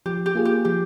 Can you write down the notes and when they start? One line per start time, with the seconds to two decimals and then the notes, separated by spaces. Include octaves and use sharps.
0.06 F3 G4
0.26 G4
0.35 A#3 F4 G#4
0.45 G4
0.65 F3 G4